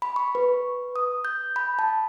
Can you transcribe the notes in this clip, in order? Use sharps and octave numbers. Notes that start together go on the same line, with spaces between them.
B5
C#6
B4
D#6
G6
B5
A5